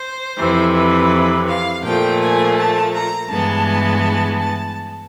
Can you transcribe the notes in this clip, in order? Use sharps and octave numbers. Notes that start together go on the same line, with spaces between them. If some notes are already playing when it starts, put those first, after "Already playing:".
Already playing: C5
F2 C3 E3
B4
F5
A#2 F3 A3 G5
G#5
A5
A#5
G2 E3 G#3 B3 A5
A5